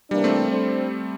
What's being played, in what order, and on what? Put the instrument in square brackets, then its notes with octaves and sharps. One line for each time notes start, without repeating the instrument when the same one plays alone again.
[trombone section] C3 E3 A#3 D4 [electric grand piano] G3
[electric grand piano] A3 C4
[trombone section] G3 D4 A4 C5